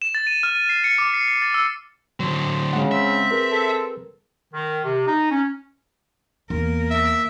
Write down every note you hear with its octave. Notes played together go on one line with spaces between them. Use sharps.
E7
A6
D#7
F6
D#7
C7
C#7
D6
C7
C7
A6
E6
D3 F#3 C5
C#3 G#3 F#5
C4 E5
G#4 A#4 B4
A4
D#3
C3
D#4
C#4
E2 A#3 A#4
E5